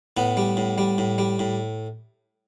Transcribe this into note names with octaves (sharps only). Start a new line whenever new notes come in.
A2 B3
G3
A2
G3
A2
G3
A2